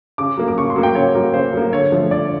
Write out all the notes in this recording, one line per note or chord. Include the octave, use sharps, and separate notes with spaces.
C#3 D6
F#3 A#3
D6
C#3 C#6
C6
F#3 A#3
G5
C#3 C#5
F#3 A#3
C#3 C5
F#3 A#3
D3 C#5
F3 A3
D3 D5